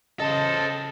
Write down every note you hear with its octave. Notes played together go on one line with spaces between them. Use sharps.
C#3 A4 C5 D#5 A5